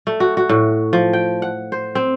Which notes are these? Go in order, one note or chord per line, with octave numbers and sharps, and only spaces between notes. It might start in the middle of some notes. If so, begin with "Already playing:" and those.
A3
F#4
F#4
A2
F3
G5
F#5
C5
C4